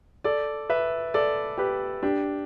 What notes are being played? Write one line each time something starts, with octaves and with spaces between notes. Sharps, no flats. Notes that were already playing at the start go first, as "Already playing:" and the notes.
A4 D5
B4 E5
A4 D5
G4 B4
D4 G4